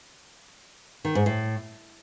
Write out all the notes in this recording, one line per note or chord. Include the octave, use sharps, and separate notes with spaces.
D#3
G#2
A2